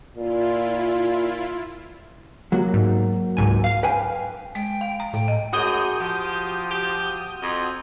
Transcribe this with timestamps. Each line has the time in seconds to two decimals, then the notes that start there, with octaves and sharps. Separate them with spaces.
0.16 A#2 E4 F4
2.52 F#3 A#3 F#4
2.74 G#2
3.37 C#2 G#2 G#5
3.64 F5
3.83 B4 G5 G#5
4.55 G#3 G5
4.81 F5
5.00 A#5
5.14 A2 G5
5.28 D#5
5.53 F#2 F#4 G#4 D#6 G6
6.00 F3 G4
6.71 G4
7.43 F2